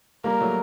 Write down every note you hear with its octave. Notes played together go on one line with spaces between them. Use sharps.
G3 A#3 A#4
F#3 A3